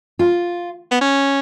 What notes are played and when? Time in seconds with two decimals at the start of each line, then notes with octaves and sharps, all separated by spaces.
0.19 F4
0.91 B3
1.01 C#4